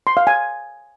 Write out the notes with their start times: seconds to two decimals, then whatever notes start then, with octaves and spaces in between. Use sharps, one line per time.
0.07 C6
0.17 F5
0.27 G#5